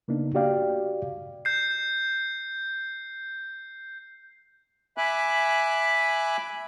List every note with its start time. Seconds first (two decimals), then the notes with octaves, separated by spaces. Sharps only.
0.08 C#3 A#3 B3 D4 D#4
0.35 F#4 G4 D5 F5 G5
1.45 G6 C7
4.97 E5 G#5 B5 D6 F#6